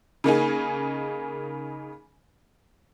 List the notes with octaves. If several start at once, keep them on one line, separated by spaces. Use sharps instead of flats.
C#3 A#3 D#4 G#4